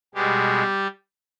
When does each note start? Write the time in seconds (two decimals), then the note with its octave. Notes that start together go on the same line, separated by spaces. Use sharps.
0.15 B2 G3 G#3 G4